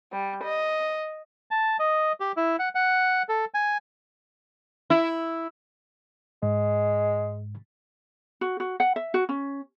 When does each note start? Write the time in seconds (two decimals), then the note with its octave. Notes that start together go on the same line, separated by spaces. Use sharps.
0.11 G3
0.43 D#5
1.51 A5
1.79 D#5
2.20 G4
2.37 E4
2.59 F#5
2.75 F#5
3.29 A4
3.54 G#5
4.90 E4
6.43 G#2 G#3
8.41 F#4
8.60 F#4
8.80 F#5
8.96 E5
9.14 F#4
9.29 C#4